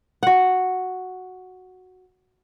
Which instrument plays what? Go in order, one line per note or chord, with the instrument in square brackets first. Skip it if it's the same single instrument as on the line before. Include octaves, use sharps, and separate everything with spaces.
[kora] F#4 F#5